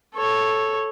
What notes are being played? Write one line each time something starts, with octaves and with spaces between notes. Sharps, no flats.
A4 C#5